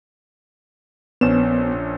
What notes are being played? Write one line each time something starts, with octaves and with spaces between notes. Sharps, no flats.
A#1 B3 C#4 E7